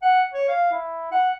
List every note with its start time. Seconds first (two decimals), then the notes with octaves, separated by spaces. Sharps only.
0.02 F#5
0.33 C#5
0.48 F5
0.72 E4
1.11 F#5